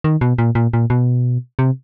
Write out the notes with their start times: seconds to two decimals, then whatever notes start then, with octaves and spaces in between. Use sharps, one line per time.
0.04 D#3
0.21 B2
0.38 A#2
0.55 A#2
0.73 A#2
0.90 B2
1.59 C3